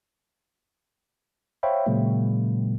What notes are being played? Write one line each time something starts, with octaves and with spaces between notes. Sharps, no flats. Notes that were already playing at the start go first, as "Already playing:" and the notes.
C5 C#5 E5 F5 G5 B5
A#2 C#3 F#3 G#3 A#3